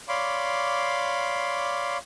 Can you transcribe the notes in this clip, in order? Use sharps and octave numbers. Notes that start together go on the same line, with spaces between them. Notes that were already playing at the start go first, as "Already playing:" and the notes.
C#5 D5 F5 B5 C6 D6